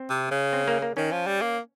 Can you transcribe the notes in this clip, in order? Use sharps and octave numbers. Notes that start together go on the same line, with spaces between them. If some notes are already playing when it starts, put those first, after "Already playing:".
Already playing: C4
C3
C#3
C4
A#3
A#3
D#3 C#4
F3
G3
A#3